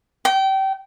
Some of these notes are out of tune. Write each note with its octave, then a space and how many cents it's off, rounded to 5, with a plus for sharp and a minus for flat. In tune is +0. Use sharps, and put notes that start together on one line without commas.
G5 -25